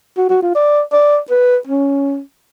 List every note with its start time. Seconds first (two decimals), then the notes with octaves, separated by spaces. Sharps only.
0.17 F#4
0.29 F#4
0.43 F4
0.55 D5
0.92 D5
1.30 B4
1.67 C#4